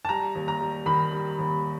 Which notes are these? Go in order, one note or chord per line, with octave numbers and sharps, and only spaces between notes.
A5
G3 A#5
D#2
A#5
G3
D#3 B5
G3
D#2